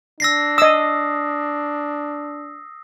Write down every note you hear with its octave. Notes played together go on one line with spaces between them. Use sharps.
D4 E6 A#6 C7
D#5 D#6 E6